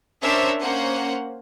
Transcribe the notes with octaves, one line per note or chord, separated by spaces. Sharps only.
C#4 D4 A#4 C5 E5
A#3 C#4 C5 F#5